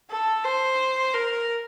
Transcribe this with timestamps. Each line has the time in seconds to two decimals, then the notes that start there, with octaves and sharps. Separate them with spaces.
0.10 A4
0.45 C5
1.14 A#4